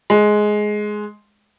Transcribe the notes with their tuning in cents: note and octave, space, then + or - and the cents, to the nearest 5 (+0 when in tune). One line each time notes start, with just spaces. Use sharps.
G#3 +10